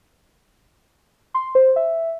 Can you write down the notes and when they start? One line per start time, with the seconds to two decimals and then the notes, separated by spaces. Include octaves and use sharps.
1.34 C6
1.55 C5
1.76 E5